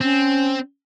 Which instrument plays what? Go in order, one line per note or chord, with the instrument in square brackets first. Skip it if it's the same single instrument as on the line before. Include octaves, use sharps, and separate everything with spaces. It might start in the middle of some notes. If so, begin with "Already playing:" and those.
[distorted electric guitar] C4 [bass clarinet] C#4